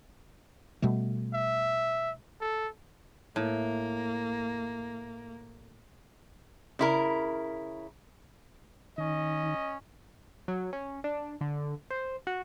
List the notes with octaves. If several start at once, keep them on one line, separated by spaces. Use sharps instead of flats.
B2 G3 A3
E5
A4
A2 A#3
C#3 E4 A#4
D#3 C#4 D#5
F#3
C#4
D4
D3
C5
F#4